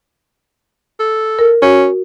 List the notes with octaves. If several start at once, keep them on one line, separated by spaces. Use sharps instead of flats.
A4
A#4
C#4 F#4